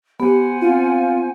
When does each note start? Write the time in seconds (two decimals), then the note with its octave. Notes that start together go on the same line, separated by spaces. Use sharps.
0.20 B3 G4 C5 F#5 G#5
0.62 C4 F4